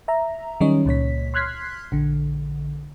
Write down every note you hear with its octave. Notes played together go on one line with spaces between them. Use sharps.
E5 A#5
D#3 F#3 G3 C#4 C#5 D#5
C#2 A#2 C#5 B6
C6 F6 F#6 G#6 B6 C7
A#1 D3